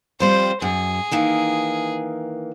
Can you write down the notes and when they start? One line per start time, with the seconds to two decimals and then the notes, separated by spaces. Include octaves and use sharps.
0.20 F3 G3 C4 C5
0.62 F#2 G#4
1.11 D#3 E3 A#3